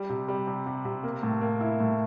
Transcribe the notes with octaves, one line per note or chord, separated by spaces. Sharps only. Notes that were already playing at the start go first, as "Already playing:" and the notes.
Already playing: G3
C3
G3
C3
C3
C3
A#3
A2
A#3
E4
A2